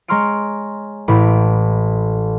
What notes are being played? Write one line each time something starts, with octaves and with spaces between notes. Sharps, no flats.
G#3 C#5 A#5 C6 F6 D7
A1 A2 B5 D7